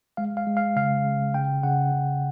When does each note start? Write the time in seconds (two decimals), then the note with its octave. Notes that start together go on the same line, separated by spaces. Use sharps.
0.17 G#3 F5
0.37 F5
0.47 G#3
0.57 F5
0.76 C#3 F5
1.05 C#3
1.34 C#3 G5
1.63 C#3 F#5
1.92 C#3